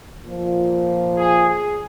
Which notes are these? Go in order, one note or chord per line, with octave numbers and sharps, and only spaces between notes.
A#2 F3
G#4
G#4